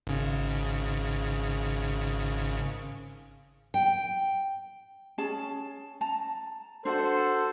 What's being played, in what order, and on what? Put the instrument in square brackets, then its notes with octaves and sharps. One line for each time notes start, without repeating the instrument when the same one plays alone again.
[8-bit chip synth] G#1 C#3
[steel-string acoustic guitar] G5
[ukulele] C#4 G#4 A5
A5 A#5
[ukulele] D4 F#5 [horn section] F#4 A4 C5